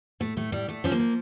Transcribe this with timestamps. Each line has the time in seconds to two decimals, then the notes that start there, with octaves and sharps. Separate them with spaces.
0.20 A2 A3
0.37 A2 A3
0.52 A2 G3
0.68 A2 A3
0.84 F3 C#4
0.91 A#3
0.99 F3